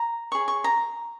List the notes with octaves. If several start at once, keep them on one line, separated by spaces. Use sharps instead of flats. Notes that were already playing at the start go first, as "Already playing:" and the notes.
Already playing: A#5
G#4 C#5 C#6
C#6
A#5